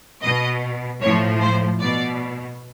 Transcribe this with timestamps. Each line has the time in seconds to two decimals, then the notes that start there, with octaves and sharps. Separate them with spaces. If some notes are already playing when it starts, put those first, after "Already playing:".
0.23 B2 D#5
1.01 A2 F3 C#5
1.41 C5
1.80 B2 D5